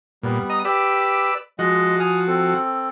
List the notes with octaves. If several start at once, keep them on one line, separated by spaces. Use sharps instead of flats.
A#2 G3 B3
D#5 A#5 D#6
G4 B4 D5 E6
F3 G#3 F#4 D#5
G#5 D#6 F6
C4 A4